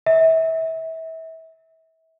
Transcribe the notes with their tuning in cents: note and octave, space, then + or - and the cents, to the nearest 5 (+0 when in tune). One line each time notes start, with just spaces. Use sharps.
E5 -30